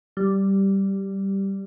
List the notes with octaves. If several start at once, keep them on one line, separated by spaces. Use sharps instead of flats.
G3